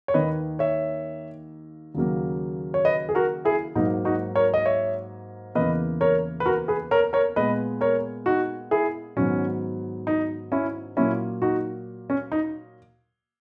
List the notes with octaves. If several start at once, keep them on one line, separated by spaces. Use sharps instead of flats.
C#5
D#2 D#3 A#3 B4 D#5
C#5 E5
D#2 C#3 F#3 A#3
C#5
B4 D#5
G#4
F#4 A#4
E4 G#4
G#2 F#3 A#3 D#4
D#4 F#4
A#4 C#5
D#5
C#5 E5
E2 C#3 E3 A#3 B4 D#5
A#4 C#5
B4
F#4 A#4
G#4 B4
A#4 C#5
A#4 C#5
A#2 G#3 B3 B4 D#5
A#4 C#5
D#4 F#4
E4 G#4
G#2 D#3 F#3 B3 C#4
D#4
C#4 E4
A#2 F#3 A#3 C#4 E4
D#4 F#4
C#4
D#4